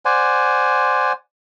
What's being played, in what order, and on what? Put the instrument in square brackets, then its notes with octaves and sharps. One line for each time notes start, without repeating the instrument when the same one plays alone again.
[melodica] C5 D5 F#5 G#5